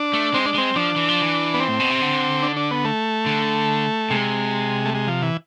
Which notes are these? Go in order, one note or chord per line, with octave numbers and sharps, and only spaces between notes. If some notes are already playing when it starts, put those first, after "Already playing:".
Already playing: D4
A3
G#3 C4
D4
G#3 C4
F3 D4
E3
F3
E3
B3
C4
A2
B2
C3
D3
D4
D4
B3
A3
D3
C3 G#3
A3
G#3
F3
E3